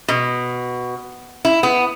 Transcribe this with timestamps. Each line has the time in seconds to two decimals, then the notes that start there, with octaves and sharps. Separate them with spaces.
0.08 B2
1.45 E4
1.63 B3